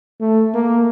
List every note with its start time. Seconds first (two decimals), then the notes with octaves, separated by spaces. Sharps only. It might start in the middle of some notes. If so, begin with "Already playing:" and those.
0.20 A3
0.54 A#3